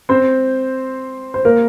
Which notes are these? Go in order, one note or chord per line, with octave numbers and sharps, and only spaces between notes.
C4 C5
C5
A#3 A#4